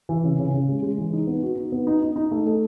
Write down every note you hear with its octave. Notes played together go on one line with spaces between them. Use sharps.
E3
C#3
C#3
C#3
G#3
G#3
E3
D#4
B3
F#4
D#4
B3
D#4
D#4
D#4
A3
A4